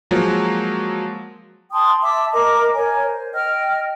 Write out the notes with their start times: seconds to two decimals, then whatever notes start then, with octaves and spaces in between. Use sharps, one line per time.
0.11 F3 F#3 G#3 A#3
1.72 G5 A5 C6 D#6
2.03 E5 A5 D6 E6
2.32 A#4 D#5 D6
2.74 A#4 C#5 G#5
3.05 C5
3.34 D#5 G5 F6